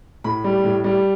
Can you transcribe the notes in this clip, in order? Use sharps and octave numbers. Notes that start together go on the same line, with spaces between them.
A2 B5
G3
A2
G3